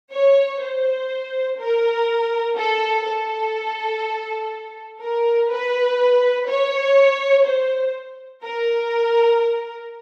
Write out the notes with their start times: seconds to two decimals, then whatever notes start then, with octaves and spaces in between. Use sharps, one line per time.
0.12 C#5
0.62 C5
1.60 A#4
2.57 A4
3.06 A4
5.01 A#4
5.50 B4
6.48 C#5
7.46 C5
8.42 A#4